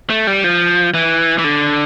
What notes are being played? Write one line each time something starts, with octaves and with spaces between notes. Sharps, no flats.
A3
G3
F3
E3
E3
D3